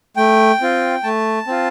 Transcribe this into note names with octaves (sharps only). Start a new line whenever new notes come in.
A3 G5
C4 F4
A3 A5
C4 F4